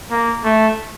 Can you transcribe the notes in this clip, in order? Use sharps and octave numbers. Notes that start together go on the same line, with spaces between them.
A#3
A3